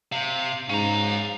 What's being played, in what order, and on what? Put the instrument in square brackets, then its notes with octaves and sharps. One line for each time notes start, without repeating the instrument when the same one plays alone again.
[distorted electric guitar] C3 [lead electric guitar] F5
[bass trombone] G#2 [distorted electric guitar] C#4 A#5 [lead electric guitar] F5